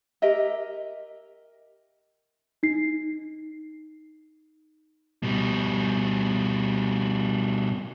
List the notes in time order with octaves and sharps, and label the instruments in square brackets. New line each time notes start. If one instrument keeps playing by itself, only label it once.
[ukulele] G4 A#4 D#5 E5
[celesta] D#4 C7
[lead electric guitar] B2 G3